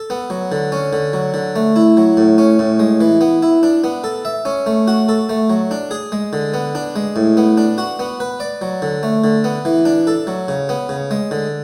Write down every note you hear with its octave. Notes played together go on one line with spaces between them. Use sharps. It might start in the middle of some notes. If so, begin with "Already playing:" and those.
Already playing: A4
B3
F#3
D3
C#4
D3
F#3
D3
A3
E4
F#3
A2
C#4
A2
G#3
E3
B3
E4
D4
B3
A4
E5
C#4
A3
F#4
A4
A3
F#3
D4
G#4
G#3
D3
B3
D4
G#3
A2
B3
D4
F#4
B3
B4
D5
F#3
D3
A3
D3
B3
E3
D4
A4
F#3
C#3
B3
C#3
G#3
D3